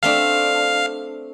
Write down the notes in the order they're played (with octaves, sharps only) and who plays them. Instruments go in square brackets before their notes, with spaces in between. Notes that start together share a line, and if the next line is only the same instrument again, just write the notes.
[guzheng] A3 C4 D4 [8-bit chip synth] F5